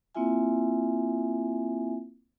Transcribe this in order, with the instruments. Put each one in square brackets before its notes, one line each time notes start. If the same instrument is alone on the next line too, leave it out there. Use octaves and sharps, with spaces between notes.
[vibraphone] A#3 C4 E4 F4 E5 G#5